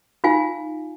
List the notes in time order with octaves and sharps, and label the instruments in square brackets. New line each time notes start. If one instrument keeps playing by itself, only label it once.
[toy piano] D#4 F4 F5 G#5